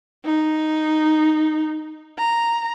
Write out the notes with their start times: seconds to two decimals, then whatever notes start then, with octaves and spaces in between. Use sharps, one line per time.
0.25 D#4
2.18 A#5